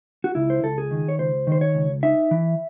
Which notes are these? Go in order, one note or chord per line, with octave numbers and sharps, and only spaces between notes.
F#4
C#2 E4
C5
C#2 A4
G#4
D#3
C#5
C#2 C5
D#3 C5
C#5
C#2
D#4 E5
E3